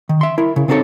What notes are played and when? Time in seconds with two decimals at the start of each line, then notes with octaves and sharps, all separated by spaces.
0.09 D#3
0.21 E5 C6
0.38 E4 A#4
0.56 C#3
0.68 C#3 B3 C4 D#4 A4 C#5